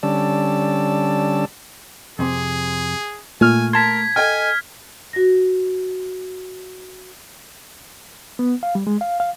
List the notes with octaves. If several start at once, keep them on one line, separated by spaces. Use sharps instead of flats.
D3 G3 C#4 D5 A5 E6
F2 C3 G#4
A#2 A3 G#5 F6
A#4 A5 C6 G#6 B6
A4 D#5 G5 G#5 F6
F#4 A#6
B3
F5
G3
G#3
F5
F5